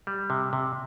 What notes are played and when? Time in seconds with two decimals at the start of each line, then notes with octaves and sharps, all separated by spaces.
0.07 G3
0.30 C3
0.53 C3